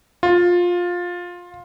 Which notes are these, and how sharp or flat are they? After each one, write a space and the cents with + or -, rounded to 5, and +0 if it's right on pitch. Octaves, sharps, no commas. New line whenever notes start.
F4 +15